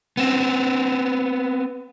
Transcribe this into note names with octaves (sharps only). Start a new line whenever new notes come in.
B3 C4